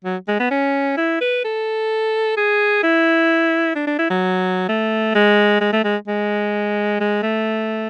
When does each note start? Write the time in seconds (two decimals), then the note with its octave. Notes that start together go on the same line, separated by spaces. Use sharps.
0.04 F#3
0.28 G#3
0.40 B3
0.51 C#4
0.97 E4
1.21 B4
1.44 A4
2.37 G#4
2.83 E4
3.75 D4
3.87 D4
3.99 E4
4.10 F#3
4.69 A3
5.15 G#3
5.61 G#3
5.73 A3
5.84 G#3
6.07 G#3
7.00 G#3
7.23 A3